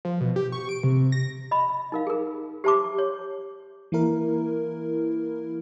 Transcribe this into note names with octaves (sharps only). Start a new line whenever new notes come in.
F3
B2
G4
C#6
D7
C3
A#6
D#5 B5
D#4 A#4 F5
G#4 A#4
G4 C5 E5 A5 C6 D6
C#5
E3 A#3 E4 A#4